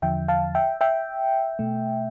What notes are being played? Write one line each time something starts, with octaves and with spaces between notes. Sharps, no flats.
E2 D3 F3 E5 G5
F5 A5
E5 G5
E5 G5
B2 A3